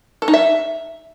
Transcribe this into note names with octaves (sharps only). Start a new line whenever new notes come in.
A4
D#4
E5